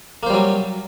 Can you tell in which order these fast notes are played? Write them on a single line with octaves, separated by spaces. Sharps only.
A#3 C5 G3 F#3